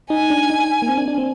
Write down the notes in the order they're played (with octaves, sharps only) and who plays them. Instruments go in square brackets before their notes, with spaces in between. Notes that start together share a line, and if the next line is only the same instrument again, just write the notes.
[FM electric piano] D#4 [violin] G#5
[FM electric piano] D4
D#4
A#3
C4
D4
D4
C4